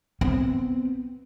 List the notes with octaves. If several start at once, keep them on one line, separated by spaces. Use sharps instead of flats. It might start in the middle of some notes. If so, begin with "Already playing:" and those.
B3 C4